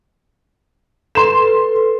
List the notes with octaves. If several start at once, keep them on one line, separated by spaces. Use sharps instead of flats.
A4 B4 C6 E7